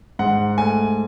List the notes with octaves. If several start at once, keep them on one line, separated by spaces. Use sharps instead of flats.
G#2 F#5
A3 G#5